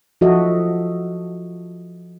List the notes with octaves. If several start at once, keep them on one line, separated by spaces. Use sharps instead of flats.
F3 F#4 A4 D#5 E5